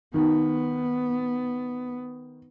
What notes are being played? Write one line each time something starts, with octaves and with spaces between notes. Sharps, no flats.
D#3 B3